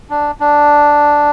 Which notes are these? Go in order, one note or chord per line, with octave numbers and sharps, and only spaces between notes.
D4
D4